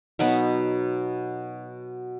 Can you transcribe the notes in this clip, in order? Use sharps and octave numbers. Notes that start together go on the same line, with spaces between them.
B2 F#3 D#4 B4